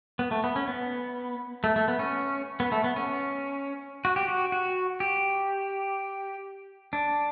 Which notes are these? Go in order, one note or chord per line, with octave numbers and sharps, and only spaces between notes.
B3
A3
B3
C#4
B3
A3
A3
B3
C#4
B3
A3
B3
C#4
F#4
G4
F#4
F#4
G4
D4